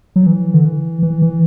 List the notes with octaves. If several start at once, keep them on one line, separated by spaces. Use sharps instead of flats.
F#3
E3
D3
E3
E3
E3